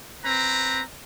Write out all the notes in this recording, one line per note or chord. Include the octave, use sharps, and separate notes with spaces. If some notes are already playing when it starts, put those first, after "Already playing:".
C4 B4 A#5